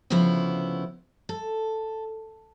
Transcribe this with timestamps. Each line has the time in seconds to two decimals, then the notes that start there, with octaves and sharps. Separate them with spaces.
0.10 D2 C#3 F3 B3 E4
1.29 A4